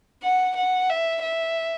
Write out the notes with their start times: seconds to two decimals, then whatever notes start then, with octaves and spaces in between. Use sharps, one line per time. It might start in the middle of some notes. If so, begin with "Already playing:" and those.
0.24 F#5
0.56 F#5
0.90 E5
1.22 E5